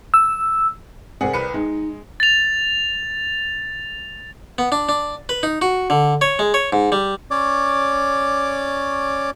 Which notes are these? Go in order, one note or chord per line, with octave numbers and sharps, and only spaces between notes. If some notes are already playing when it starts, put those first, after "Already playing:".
E6
C3 G#4 A#4 C5 D5 F#5
C2 B4 C#7
G#3 D#4
A6 F7
B3
D4
D4
B4
D#4
F#4
D3
C#5
G#3
C#5
G#2
G3
C#4 C#5 D5 D6